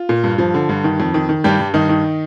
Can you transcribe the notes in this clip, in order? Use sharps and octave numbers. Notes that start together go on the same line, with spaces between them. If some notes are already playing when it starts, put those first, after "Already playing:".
Already playing: F4
A#2
G2
F3
D3
G2
D#3
F2
D#3
D#3
G2 G3 G4
G2
G2 D#3 D#4
D#3